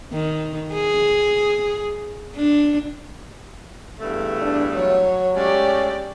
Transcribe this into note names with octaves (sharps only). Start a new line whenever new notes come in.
D#3
G#4
D4
E2 G2 A3
D4
F#3 C#5
G#3 A3 C#4 G4 D5